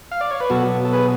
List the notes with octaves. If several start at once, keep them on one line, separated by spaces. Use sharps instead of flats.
F5
D5
C#5
B4
B2 F#3 B3 F#4 A4
A4
G#4 B4